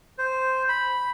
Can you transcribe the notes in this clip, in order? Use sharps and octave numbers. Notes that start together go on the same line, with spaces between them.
C5
B5